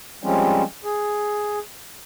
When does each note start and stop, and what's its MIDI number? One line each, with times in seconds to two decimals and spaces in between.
0.24 0.63 53
0.24 0.63 55
0.24 0.63 56
0.24 0.63 60
0.24 0.63 61
0.84 1.59 68